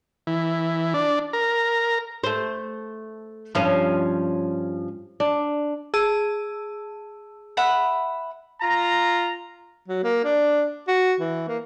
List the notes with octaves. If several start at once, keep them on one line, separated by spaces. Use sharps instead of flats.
E3
D4
A#4
A3 C5
G2 F3 C#4
D4
G#4 A5 E6
E5 F#5 B5
F4 A#5
F#3
A#3
D4
F#4
E3
A#3